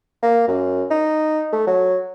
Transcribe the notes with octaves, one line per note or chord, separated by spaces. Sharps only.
A#3
F#2
D#4
A3
F#3